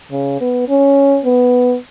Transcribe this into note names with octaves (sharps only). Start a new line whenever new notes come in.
C#3
B3
C#4
B3